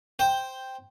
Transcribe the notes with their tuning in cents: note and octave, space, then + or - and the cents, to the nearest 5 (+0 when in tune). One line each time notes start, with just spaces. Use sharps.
C5 +0 G5 +0